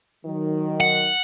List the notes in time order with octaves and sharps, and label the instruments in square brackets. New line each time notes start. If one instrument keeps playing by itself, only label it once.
[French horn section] D#3 F#3
[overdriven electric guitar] F#5